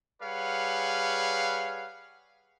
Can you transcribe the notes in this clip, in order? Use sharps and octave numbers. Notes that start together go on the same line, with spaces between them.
G3 G#4 B4 C#5 F5 F#5